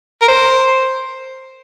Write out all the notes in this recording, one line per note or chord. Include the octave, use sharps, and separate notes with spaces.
A#4
C5